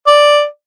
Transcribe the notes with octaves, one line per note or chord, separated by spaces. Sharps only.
D5